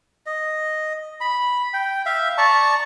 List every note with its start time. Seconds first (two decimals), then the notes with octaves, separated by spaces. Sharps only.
0.26 D#5
1.21 B5
1.74 G5
2.06 E5 F5
2.38 D5 A5 A#5 C#6